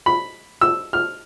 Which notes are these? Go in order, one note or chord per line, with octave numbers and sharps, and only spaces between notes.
B5
E6
F6